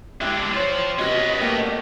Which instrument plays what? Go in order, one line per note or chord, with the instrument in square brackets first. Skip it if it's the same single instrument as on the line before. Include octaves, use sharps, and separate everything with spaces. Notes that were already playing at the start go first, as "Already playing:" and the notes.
[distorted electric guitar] G#3 D4 [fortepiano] E4 G4
[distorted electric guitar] F4 C5 [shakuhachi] C#5
[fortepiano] C3 F#4 B4 [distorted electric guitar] B3 C#4 [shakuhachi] D#5
[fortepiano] A3 A#3 G4
[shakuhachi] D5